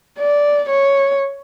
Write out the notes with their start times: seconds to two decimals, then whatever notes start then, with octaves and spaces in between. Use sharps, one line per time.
0.19 D5
0.69 C#5